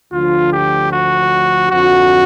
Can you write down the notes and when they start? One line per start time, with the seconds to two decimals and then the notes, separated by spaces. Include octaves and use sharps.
0.12 D2 D3 F3 F4
0.52 G4
0.91 F#4
1.70 F2 D3 F3 F#4